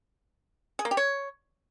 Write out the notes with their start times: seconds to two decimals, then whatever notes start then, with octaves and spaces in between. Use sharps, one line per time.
0.79 G#4
0.85 A#3
0.91 G4
0.97 C#5